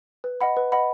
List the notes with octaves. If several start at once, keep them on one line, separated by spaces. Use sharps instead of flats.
B4
D#5 F#5 B5
B4
D#5 F#5 B5